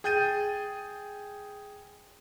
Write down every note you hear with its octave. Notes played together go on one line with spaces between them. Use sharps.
G#4 G5 G6 A6 D#7